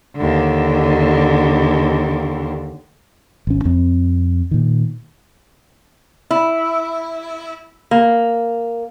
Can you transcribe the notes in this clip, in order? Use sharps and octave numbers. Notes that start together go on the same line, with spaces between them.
D#2 D3
G#1 C#4
F2 C4
A#2 D#3
E4
A#3